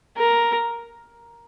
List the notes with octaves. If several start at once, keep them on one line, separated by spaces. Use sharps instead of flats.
A#4